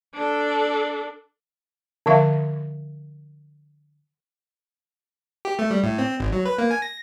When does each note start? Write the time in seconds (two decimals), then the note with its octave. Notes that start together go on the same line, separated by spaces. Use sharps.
0.15 D4 A4
2.06 D3 F3 E5 F5
5.45 G4
5.59 A3
5.71 G3
5.84 A2
5.98 C4
6.20 G#1
6.32 F#3
6.45 B4
6.58 A#3
6.71 G#5
6.82 A#6